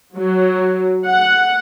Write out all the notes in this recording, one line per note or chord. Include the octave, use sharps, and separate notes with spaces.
F#3
F#5